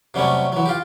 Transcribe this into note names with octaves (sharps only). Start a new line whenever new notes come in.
C3 F#3 G3 A3 C#4
E3 F#3
F4 G4